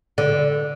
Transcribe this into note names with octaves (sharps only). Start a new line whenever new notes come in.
D3